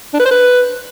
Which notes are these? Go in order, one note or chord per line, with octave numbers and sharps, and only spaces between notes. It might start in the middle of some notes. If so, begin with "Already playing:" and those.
D4
B4
C5
B4